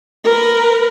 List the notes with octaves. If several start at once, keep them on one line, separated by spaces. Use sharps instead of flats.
A#4 B4